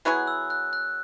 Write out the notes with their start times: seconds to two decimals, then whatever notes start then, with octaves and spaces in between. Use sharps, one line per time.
0.05 F#3 B3 E4 G#4 F#6
0.27 E6
0.50 F#6
0.73 F#6